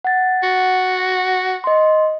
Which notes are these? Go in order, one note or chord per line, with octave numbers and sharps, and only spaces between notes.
F#5 A6
F#4
D#5 C6